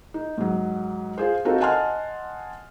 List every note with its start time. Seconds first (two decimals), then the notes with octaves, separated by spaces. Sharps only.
0.14 D#4
0.38 G#2 F#3
1.18 F4 G#4 C5
1.45 C4 D#4 F4 F#4 A4 A#4
1.60 D#5 F#5 G#5 A5 C6 F6